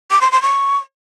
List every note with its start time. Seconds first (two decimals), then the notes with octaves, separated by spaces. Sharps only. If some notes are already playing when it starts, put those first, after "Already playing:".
0.11 D6
0.21 C6
0.32 C6
0.42 C#6